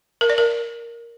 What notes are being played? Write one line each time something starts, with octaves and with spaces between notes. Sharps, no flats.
A#4
D5
A#4